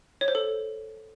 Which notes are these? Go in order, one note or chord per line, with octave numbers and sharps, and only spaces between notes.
C#5
C5
A4